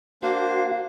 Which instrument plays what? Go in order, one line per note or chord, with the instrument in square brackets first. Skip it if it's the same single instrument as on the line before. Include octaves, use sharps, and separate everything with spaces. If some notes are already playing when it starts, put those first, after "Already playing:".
[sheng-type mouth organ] A#3 D4 C5 [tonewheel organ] F#4 [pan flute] F5